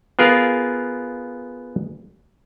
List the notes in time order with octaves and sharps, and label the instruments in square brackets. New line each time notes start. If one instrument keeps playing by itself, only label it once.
[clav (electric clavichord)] B3 F4 G#4 A#4 F5